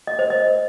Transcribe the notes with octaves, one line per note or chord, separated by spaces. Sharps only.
D#5
C5
D#5